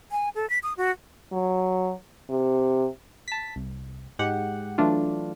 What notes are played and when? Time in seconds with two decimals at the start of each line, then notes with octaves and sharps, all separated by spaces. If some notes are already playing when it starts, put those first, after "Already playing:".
0.11 G#5
0.35 A4
0.50 B6
0.63 D#6
0.77 F#4
1.32 F#3
2.30 C3
3.28 A5 B6
3.56 C2
4.19 G#2 G#3 G4 F#5
4.78 E3 F#3 A3 D4 F4